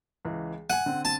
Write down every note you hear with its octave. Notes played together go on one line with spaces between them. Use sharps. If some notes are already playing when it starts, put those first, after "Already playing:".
C#2 E3
F#5 G#5 D#7
D3 C4
A5